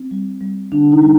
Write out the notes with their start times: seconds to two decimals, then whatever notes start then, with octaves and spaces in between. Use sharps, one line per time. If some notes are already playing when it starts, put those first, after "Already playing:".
Already playing: C4
0.11 G3
0.41 G3
0.72 D3 D4
0.92 D#4
1.02 G3